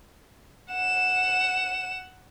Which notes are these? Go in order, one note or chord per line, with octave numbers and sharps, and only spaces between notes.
F#5 E7